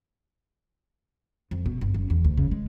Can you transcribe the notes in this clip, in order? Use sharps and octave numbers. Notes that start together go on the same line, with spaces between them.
F2
B2
G1
F#2
E2
D2
C#3
G#3